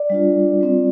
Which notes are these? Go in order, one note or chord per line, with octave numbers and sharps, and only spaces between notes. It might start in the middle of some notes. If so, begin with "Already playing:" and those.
Already playing: D5
G3 D4 F4
G3 C4 F4